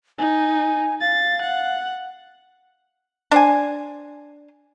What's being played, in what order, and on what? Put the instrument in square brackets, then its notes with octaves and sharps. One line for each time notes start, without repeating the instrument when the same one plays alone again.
[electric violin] D#4 [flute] G#5
[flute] F5 [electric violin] A6
[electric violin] F#5
[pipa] D4 C5 G#5